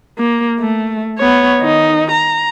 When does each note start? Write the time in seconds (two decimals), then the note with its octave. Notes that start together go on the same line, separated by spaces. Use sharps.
0.18 A#3
0.59 A3
1.18 B3 C#5
1.60 D#3 D#4
2.11 A#5